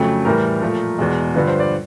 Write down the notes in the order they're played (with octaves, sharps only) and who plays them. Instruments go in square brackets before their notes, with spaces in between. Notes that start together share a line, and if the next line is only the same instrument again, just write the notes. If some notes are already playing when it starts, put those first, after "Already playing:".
Already playing: [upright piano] F2 C#3 F#3 A3
A2 E3 G3 A#4
A#2 F3 A3
E2 B2 G#3
G2 D3 F3 B4
C5
D5